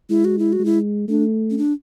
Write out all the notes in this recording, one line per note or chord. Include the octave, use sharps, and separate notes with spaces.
G#3 E4
F#4
E4
F#4
G#3
E4
A3 D4
C#4
D4